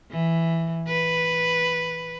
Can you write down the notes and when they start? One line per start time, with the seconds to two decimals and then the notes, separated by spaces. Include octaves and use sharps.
0.11 E3
0.88 B4